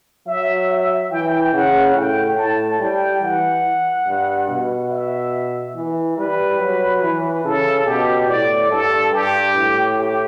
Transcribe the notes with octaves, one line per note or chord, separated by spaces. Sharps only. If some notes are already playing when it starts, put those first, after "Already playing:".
F#3 E5
E5
E3 G5
C#3 F#5
A2 G5
A2 A5
G3 G5
E3 F#5
G2
B2
E5
E3
G3 B4
F#3
E3
C#3 A4
B2 G4
A2 D5
G2 A4
G2 G4
A2
G4